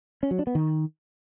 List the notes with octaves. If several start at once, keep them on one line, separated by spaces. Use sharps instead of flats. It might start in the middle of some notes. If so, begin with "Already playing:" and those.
C#4
F#3
D4
B3
D#3